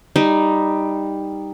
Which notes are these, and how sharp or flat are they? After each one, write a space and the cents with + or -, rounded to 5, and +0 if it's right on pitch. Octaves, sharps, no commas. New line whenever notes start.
G3 +10 D#4 +0